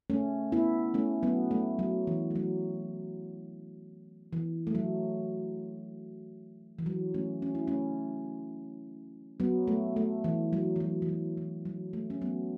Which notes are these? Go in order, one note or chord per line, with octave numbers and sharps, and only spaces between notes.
A3 C#4
B3 E4
A3 C#4
F#3 B3
A3
F#3
E3
A3
F#3
E3
A3
F#3
E3
F#3
A3 C#4
C#4
E4
A3 C#4
F#3 B3
A3
A3
E3
F#3
E3
F#3
E3
F#3
E3
F#3
A3
C#4
F#3 B3